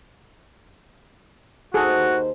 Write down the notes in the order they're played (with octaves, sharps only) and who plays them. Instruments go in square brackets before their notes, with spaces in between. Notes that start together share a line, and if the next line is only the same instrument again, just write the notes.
[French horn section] D#2 D#4 C5 [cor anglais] F#4 [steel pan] G#4 A4